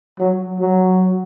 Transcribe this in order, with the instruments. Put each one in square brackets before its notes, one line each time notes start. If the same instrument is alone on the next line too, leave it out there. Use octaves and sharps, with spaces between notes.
[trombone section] F#3
F#3